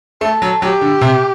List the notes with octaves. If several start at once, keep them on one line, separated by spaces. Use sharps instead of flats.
A3 A4
F#3
F#3 G4
D3
C3